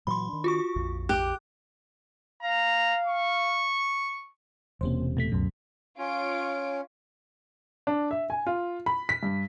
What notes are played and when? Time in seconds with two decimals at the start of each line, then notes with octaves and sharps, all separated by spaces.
0.07 A#2 E3 F#3 B5 C6
0.29 D#3 D4
0.44 F4 F#4 C#6
0.76 A#1 F2
1.09 G4 D6 F#6
2.43 F5 A#5
3.06 C#6
4.81 E1 C3 A#3 C#4 C5
5.17 B2 A3 B6
5.32 C#2 F#2 B2
5.98 C#4 F4 C#5 D7
7.87 D4
8.11 E5
8.30 G#5
8.46 F4
8.86 B5
9.09 B6
9.23 G2